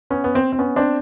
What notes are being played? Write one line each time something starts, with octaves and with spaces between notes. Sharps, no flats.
B3 C#4
B3
C4
C4
B3 C#4
C4 D4